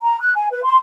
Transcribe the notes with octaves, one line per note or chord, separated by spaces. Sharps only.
A#5
F#6
G#5
B4
C6